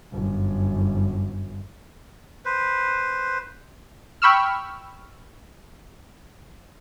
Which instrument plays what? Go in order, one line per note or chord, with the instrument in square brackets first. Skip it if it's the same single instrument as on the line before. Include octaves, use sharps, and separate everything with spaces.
[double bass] G1 F#2
[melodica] B4 C5
[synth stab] G5 B5 C#6 E6 F6